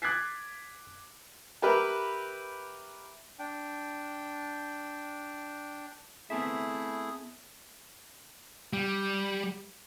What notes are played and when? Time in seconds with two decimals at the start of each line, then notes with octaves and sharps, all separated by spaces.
0.02 D6 F#6 G#6 A6 B6 C7
1.62 G4 A#4 B4 E5
3.39 D4 G5
6.30 A3 B3 C4 E4 G#4 E5
8.73 G3